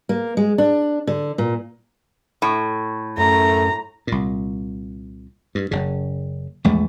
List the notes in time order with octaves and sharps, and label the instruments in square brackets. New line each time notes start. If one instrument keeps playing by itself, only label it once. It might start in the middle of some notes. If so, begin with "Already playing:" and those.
[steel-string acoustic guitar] A#3
G#3
D4
D3
A#2
[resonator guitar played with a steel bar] A2
[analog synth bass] F#2 [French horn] A3 [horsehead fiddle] A#5
[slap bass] C2 A#2
G2
F#1 C#3
A#1 E2 G#3 A3